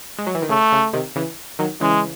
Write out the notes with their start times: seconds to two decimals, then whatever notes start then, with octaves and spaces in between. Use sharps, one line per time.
0.19 G#3
0.27 F#3
0.35 E3
0.42 D#3
0.49 C#3 A3
0.72 C#3
0.93 C3 D#3
1.16 C#3 E3
1.59 D#3 F#3
1.81 C#3 E3 G#3